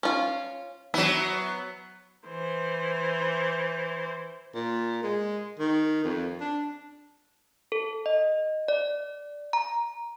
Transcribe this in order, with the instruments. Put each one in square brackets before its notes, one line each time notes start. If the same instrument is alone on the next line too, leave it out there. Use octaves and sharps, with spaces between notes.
[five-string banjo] C#4 F4
[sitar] F#3 B3 [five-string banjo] E4
[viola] E3 C5
[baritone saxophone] A#2
G#3
D#3
F2
D4
[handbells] A4
D#5
D5
A#5